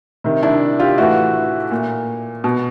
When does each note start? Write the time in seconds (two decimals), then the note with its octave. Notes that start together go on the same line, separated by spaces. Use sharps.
0.24 C3 D#3
0.43 D4 E4
0.80 F4 G4
0.98 A2 E3 E4 F#4
1.71 A#2
2.44 B2